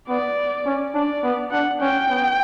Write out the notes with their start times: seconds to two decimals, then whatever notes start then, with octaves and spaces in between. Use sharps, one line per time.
0.09 B3 D5
0.66 C#4
0.94 D4 D5
1.23 B3
1.51 D4 F#5
1.81 C#4 G5
2.09 B3